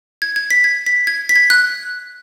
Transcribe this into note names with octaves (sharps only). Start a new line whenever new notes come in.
G#6
G#6
B6
G#6
B6
G#6
B6
G#6
F#6